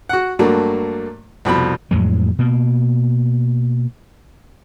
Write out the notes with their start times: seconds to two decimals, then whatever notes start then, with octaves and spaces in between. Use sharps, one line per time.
0.09 F#4 F#5
0.39 G2 F#3 A3 A#3
1.45 C2 F2 B2 B5
1.91 F2 A2 F#3 G#3
2.39 B2 A#3